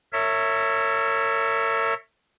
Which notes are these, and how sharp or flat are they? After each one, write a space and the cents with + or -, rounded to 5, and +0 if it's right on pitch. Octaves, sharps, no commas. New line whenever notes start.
A#4 -45 C#5 +0 E5 +0